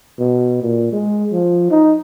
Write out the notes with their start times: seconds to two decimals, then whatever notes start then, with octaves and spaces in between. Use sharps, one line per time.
0.19 B2
0.62 A#2
0.92 G#3
1.32 F3
1.71 D#4